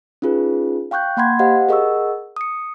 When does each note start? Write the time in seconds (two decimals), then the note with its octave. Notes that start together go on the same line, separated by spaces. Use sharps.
0.22 C#4 D#4 F4 G#4 B4
0.91 F5 G5 C#6 F#6 G6
1.17 A#3 F#5 B5 C6 G#6
1.39 G4 C5 D#5 F5 F#5
1.69 G#4 A#4 D#5 F#5 C#6 E6
2.36 D#6 C#7